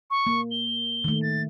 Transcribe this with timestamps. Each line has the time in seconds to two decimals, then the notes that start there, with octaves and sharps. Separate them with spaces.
0.11 C#6
0.26 A#3
0.51 G7
1.04 D#3 A3
1.22 A6